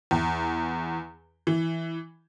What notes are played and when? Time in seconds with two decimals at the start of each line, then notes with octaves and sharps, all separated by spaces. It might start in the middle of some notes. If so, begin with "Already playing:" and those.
0.11 E2
1.47 E3